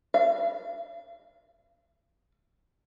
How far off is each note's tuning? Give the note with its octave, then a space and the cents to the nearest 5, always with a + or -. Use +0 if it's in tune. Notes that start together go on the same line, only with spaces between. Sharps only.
F5 -35